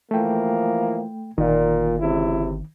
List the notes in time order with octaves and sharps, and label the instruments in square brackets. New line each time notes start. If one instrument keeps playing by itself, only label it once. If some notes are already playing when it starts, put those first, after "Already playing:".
[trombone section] E3 F3 A#3 [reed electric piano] A3 G5
[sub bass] G1 [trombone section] A#2 [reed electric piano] D#3
[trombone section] C#2 C3 E4